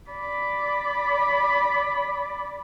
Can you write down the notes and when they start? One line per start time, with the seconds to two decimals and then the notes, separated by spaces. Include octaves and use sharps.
0.10 D5 B5